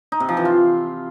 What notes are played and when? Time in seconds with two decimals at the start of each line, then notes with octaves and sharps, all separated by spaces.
0.12 D#4
0.20 C3
0.29 F3
0.37 E3
0.45 F4